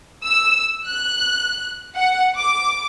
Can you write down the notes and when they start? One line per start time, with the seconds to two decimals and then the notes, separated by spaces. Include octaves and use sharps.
0.24 E6
0.86 F#6
1.96 F#5
2.37 D6